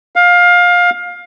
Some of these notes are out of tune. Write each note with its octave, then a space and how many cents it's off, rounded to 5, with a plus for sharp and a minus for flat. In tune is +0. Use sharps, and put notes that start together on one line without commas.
F5 +20